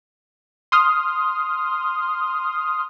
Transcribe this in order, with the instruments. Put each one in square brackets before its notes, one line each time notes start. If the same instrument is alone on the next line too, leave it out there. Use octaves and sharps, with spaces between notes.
[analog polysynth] C6 D#6 F6